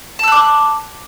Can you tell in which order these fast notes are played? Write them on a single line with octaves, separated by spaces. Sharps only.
A5 E6 F#6 D6